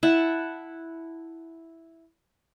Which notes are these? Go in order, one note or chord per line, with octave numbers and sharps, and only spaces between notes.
E4 E5 F#5 A5